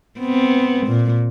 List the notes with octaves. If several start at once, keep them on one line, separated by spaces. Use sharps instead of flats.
B3 C4
A#2